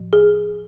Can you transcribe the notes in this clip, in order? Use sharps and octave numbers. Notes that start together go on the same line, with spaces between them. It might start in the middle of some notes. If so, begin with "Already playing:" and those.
Already playing: A2 F3
G#4